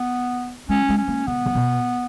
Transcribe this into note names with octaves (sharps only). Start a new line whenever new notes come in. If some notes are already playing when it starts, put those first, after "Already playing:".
Already playing: B3
G#3 C#4
G#3
C#4
A#3
C#3 B3
C#3
B2